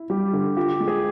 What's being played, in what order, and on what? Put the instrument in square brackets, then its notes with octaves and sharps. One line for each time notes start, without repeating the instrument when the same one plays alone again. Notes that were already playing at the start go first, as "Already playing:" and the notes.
Already playing: [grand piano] E4
[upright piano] G3 [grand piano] G4
[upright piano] D3
[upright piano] F4 [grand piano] G4
[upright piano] G#3
[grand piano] G#4